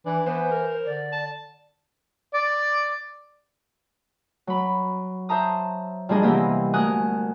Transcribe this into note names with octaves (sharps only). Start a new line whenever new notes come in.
E3 D4
E3 B3 C5
A#4
D3 D5
A5
D5
F#3 B5
C5 E5 A5 A#5 D#6
A#2 F3 G3 D4 G#4 D#5
C3 E3 A#3 B3 G4 D#5
D2 A#4 G#5 D#6 F#6